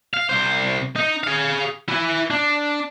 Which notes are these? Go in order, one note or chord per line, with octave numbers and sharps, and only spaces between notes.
F5
C2 C5
D#4
G#4 F5
E4 G#5
D4